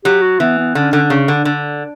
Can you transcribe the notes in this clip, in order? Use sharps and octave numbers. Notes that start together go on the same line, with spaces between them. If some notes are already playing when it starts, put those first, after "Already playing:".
F#3 G4
F#4
E3 B3
B3
D3 C#4
D3
C#3
D3
D3